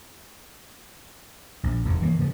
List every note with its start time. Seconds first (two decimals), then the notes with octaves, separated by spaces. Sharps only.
1.63 A#1
1.85 F1 E2
2.02 E3 G3 A#3
2.19 C#3 F3